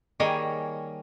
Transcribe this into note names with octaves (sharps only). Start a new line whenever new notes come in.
D#3 G3 A#3 G#4 C#5 D#5